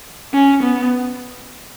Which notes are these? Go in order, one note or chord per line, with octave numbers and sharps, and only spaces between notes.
C#4
B3